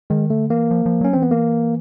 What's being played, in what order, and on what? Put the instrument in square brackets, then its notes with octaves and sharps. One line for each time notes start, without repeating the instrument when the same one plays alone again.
[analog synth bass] D#3 [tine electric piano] G#3
[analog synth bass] D3 [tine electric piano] A3
[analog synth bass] E3 [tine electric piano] A#3
[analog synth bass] F3
F3
[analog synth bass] F#3 [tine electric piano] C#4
[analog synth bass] E3 [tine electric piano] C4
[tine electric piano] B3
A#3